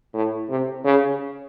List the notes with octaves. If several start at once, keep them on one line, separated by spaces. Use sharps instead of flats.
A2
C3
C#3